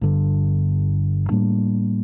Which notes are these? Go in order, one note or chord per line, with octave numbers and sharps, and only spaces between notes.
G1 G2 D3
A2 G3 A#3 D4